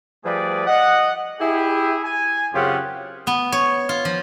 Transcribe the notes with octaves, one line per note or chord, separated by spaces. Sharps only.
F3 G3 A3 G#4 B4 D5
D#5 F#5
E4 G4 G#4
G#5
F#2 C#3 C4 F4 G4 F#5
B3
C#5
F4
F3